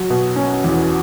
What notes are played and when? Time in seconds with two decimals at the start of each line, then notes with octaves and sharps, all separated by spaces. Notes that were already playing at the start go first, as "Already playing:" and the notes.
Already playing: F#3
0.10 B2
0.36 C#4
0.64 E2